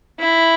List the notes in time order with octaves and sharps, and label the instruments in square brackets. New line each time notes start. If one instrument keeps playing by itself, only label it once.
[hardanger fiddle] E4